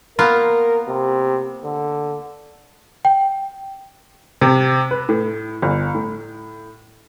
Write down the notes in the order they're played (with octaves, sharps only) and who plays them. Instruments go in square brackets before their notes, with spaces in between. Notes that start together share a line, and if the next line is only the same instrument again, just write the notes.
[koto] A#3 B3 F4 [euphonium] A#4
[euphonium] C3
D3
[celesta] G5
[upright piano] C3
B4
A2
G1
A2